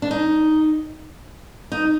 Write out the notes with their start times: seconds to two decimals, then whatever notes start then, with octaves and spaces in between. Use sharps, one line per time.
0.02 D4
0.11 D#4
1.72 D#4